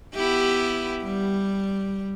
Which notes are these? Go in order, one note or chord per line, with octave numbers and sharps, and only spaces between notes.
B3 E4 G4
G3